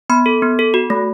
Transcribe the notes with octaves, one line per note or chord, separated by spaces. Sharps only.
B3 B5
A4
B3
A4
F#4
A3